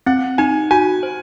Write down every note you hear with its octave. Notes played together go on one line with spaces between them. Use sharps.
C4 F#5
D#4 G#5
F#4 G#5
C5